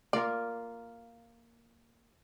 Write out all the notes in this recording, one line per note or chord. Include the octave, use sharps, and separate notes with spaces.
A#3 F4 A#4 D5